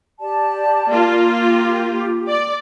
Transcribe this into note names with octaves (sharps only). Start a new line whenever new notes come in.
G4 D5 A5
A#3 F4
G4
D5